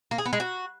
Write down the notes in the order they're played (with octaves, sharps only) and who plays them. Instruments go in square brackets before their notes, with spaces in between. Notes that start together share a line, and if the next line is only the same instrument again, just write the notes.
[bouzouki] A#3
G#4
B3
G#3
F#4